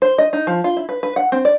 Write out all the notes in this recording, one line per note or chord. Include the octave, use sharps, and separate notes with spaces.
C5
D#5
D#4
F3
F4
E4
B4
B4
F#5
C4
D5